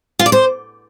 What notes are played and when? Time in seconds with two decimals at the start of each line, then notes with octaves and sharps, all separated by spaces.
0.19 F4
0.26 D5
0.32 C5